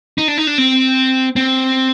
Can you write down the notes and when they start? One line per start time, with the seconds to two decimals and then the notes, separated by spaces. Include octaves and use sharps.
0.18 D#4
0.28 D4
0.38 D#4
0.47 D4
0.58 C4
1.36 C4